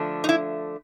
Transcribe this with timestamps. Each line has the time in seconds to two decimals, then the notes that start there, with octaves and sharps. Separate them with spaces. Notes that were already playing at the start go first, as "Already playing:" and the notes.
Already playing: D3 F3 A3 D4
0.24 D#4
0.29 E4